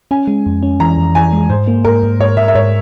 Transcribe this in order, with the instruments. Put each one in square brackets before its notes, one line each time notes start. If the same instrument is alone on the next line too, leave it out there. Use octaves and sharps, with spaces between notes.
[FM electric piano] C#4 [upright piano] G#5
[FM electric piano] G#3
F2
C#4
[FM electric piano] E3 [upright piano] A#5
[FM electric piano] F2
[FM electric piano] E3 [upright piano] G#5
[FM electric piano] G#3
[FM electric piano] G#2 [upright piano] C5
[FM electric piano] A#3
[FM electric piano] G#2 [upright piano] A#4
[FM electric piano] G#2
[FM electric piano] G#2 [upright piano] C#5
[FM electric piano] G#2 [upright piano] E5
[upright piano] E5
[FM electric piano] G#2 [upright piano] C#5